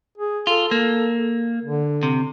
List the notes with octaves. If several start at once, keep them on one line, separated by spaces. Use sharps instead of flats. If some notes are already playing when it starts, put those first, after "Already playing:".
G#4
F4 A4
A#3
D3
C3